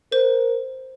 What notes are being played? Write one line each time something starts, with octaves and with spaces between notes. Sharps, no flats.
A#4 C5